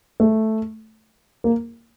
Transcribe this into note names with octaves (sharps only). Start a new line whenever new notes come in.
A3
A#3